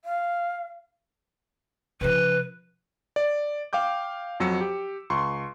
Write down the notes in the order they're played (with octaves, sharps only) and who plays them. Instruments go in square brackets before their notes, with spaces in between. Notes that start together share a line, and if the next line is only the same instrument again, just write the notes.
[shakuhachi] F5
[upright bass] C#3 F3 [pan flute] B4
[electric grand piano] D5
F5 G5 D6 G6
F2 F#3 E6 C#7
G4
C#2 C6 C#6